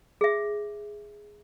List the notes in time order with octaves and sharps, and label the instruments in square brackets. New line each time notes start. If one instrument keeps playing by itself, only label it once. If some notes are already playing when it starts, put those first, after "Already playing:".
[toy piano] G#4 E5